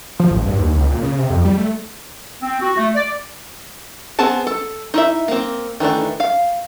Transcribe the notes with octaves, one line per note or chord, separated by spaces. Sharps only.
F3
A1
G2
D#2
C#2
A#2
C#3
C3
F2
G3
A3
C4
F#4
A3
D5
B3 C4 G#4 A5
A4
D#4 E4 E5
A#3 C4
D#3 E3 A3 D4
F5